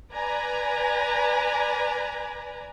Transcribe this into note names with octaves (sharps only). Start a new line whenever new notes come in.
B4 D5 G#5 A#5